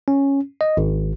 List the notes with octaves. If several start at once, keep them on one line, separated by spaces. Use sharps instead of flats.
C#4
D#5
G#1